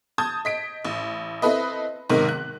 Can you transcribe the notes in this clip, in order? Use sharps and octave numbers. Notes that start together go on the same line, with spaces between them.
A5 D#6 G6 G#6
D#5 B6 D7
A1
C4 E4 A4 B4 D#5
B1 G#2 C3 D#3 A#4
F#6